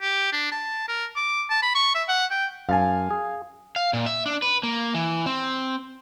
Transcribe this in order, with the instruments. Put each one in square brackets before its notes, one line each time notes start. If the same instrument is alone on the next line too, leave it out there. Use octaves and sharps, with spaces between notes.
[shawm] G4
D4
A5
A#4
D6
A5
B5
C#6
E5
F#5
G5
[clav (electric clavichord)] F#2 A5 [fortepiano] F5 G#5
[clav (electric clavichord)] G#4
[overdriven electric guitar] F5
A#2
E5
D4
B4
A#3
E3
C4